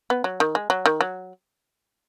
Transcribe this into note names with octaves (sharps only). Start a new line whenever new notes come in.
B3
F#3
D#3
G#3
F#3
D#3
F#3